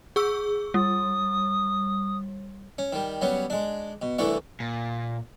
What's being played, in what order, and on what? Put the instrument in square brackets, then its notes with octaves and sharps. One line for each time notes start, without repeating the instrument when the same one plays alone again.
[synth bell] G#4 C#6 E6
[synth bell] G3 [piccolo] D#6
[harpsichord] C#4
D#3 G3
F#3 G3 B3 C#4
G#3 D4
B2
C2 D3 E3 A3 C#6
[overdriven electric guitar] A#2